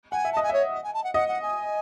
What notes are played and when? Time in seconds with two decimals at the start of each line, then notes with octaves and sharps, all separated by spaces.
0.12 F#5 G#5
0.25 E5
0.33 D#5 A5
0.43 G#5
0.49 C#5 E5
0.74 D#5
0.84 G#5
0.94 A5
1.04 F#5
1.14 D#5 F#5
1.28 F#5
1.42 G#5